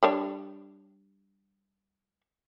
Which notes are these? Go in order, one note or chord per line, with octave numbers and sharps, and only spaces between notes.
G3 D4 C#5